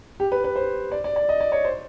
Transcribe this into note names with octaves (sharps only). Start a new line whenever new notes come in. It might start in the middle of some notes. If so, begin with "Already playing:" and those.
G4
B4
B4
C5
D5
D5
D5
D#5
D5
C#5
C5